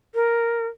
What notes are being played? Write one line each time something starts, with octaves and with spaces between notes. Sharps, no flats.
A#4